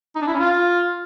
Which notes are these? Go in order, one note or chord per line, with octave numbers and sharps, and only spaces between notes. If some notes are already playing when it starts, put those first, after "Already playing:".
D#4
D4
E4
C#4
F4